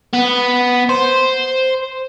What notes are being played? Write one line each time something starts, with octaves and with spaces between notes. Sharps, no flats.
B3
C5